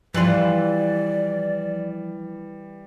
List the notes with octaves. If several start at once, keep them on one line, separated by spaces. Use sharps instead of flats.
E3 F3 G3 F4 D5 F#7